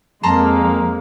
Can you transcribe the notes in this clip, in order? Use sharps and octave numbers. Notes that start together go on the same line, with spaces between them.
F2 G#3 A#3 A5 A#5 C6